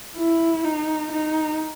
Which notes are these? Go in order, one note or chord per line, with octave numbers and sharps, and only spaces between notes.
E4
D#4
D#4